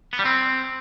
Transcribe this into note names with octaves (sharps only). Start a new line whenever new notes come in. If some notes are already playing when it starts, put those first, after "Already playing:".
B3
G3
C4